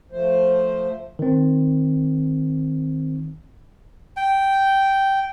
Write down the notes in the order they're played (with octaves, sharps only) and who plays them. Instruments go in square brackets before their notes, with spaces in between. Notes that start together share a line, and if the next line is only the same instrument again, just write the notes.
[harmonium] F3 A3 C5
[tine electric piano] D#3 C4
[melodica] G5